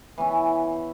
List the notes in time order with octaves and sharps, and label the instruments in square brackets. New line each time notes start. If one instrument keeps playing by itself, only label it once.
[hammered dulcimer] E3 B3 C#4